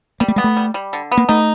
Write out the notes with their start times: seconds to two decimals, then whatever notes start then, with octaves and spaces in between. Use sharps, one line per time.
0.20 G3 A#3
0.28 A3
0.36 G#3 B3
0.44 A3
0.57 G3
0.74 G3
0.93 D3
1.11 B3
1.17 A#3
1.29 A3 D#4